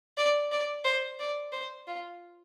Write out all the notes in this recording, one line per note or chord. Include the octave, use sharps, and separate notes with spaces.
D5
D5
C5
D5
C5
F4